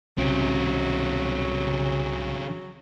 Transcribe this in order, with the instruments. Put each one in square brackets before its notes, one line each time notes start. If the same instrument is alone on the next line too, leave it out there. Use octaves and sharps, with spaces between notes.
[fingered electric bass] C2 [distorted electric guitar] C#3 C4 [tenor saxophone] F#3